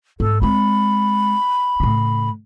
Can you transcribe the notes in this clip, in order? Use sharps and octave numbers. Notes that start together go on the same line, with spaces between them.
G#2 A4
G#3 C4 B5
A2 C#3